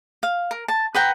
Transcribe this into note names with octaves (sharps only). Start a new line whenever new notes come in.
F5
A#4
A5
B4 F#5 G5 A#5